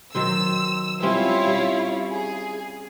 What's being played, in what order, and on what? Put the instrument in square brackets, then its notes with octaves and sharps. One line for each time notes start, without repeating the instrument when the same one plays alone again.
[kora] D#3 F#3 C5 [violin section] E6
[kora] G3 C4 C#4 [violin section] E4 F4 C#5
[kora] G3
[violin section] G#4